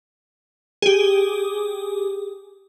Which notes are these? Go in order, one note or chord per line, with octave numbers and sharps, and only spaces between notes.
G4 G#4